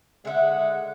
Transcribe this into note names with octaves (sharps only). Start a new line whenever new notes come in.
D3 G#3 E5 F#5